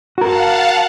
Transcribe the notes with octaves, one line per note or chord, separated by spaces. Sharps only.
F#4 A#4 F5 F#5 A5